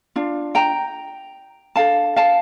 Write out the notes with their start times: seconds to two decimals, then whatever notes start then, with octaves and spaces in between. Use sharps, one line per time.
0.16 D4 F4
0.55 G5 A#5
1.76 D4 A4 F5 A5
2.16 F5 A5